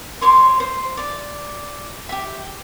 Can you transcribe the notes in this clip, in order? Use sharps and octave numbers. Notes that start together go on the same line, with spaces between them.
C5 C#5 C6 D6
C5
D5 D6
G4 E5